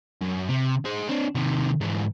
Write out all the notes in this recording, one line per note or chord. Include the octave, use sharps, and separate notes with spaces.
F#2
C3
G#4 C5
C4 D4
C3 D#3
G#2 E3